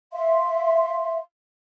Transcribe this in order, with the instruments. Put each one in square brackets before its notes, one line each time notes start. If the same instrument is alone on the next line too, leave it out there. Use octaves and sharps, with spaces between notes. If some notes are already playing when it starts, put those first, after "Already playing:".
[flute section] E5 F5 C6